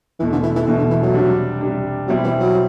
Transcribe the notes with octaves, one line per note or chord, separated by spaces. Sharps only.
E2 B2 E3 A3
D3
E3
E3
E2 B2 D3 A3
D3
E3
F#3
C3 G3 D4
C3 G3 D4
B2 F#3 G3 C4 E4
E3
F#3